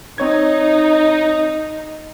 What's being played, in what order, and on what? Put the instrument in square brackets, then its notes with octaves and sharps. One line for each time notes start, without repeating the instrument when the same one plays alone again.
[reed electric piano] C4 C#5 G#6 [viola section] D#4